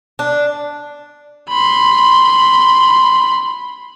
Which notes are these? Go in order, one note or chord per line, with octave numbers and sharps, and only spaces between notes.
D4
B5 C6